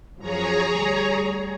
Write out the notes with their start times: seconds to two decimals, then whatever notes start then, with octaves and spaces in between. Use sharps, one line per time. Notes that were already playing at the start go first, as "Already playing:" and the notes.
0.19 F#2 F3 F#3 G#4 C#5 A#5
0.76 D2 G3